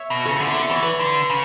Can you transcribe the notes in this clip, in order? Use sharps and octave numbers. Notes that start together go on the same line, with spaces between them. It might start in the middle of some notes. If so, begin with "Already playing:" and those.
Already playing: C#5 E5
B2
C#3 A4 C#5
D3
E5
D5
E3 C#5
B4 D5
D3
C#3